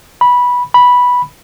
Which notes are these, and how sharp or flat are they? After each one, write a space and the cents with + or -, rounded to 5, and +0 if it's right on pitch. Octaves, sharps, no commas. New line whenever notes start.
B5 -15
B5 -10